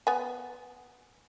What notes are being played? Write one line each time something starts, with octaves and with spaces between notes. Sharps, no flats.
B3 G#5